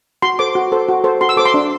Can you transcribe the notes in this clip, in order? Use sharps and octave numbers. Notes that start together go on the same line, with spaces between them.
F#4 C6
A4 C5 D6
F#4
A4 C5
F#4
A4 C5
F#4 C6
E6
A4 C5 D6
C6
D4